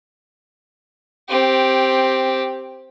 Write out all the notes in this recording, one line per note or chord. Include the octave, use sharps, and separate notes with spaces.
C4 G4